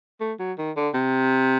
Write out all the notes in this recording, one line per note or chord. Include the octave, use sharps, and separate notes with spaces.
A3
F#3
D#3
D3
C3